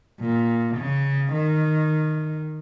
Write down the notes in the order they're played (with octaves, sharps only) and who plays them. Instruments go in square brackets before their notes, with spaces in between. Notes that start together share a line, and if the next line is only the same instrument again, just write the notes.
[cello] A#2
C#3
D#3